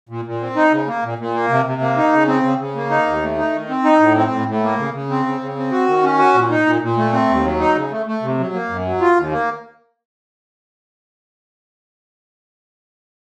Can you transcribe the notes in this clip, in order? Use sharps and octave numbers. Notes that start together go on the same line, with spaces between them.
A#2
A#2
C4
D#4
C#3
A#3
A#2
A#2
A#3
C3
C3
A#3
D#4
C#3
C4
C#3
C#3
A#3
D#4
D#2
A3
D#4
D#3
C4
D#4
A2
C4
A2
A2
A#3
C#3
C#3
C4
C#3
C#3
C4
F#4
D#3
C#4
F#4
A#2
D#4
A#2
A#2
A3
C4
D#2
F#3
D#4
C#3
A3
A3
C3
F#3
A#3
F#2
F#3
F4
D#2
A#3